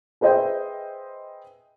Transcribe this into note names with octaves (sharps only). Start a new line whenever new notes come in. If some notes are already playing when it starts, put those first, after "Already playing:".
G#4 B4 C5 D#5 E5 G5